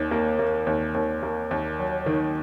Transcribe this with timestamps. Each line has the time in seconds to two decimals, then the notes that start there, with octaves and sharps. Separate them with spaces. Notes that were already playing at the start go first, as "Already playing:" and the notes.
Already playing: D#2 D#3
0.11 A#3
0.39 A#3
0.67 D#2
0.95 D#2
1.23 A#3
1.51 D#2
1.79 F#3
2.06 D#3